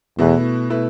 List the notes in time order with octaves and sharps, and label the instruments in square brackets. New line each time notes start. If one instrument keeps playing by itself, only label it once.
[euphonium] E2 [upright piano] B2 A3 E4 B4
[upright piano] B2 A3 E4 B4